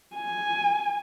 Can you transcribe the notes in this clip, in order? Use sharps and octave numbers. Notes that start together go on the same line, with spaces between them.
G#5